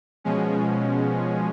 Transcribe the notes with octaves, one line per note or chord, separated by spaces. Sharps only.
B2 F3 G#3 C#4